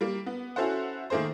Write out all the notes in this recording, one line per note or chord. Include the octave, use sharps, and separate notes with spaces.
G3 A#3
B3
C#4 E4 F#4 A4 C5 F#5
D#3 A3 A#3 G#4 C5